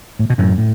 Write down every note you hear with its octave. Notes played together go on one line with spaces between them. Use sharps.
A2
B2
F#2 A2
A2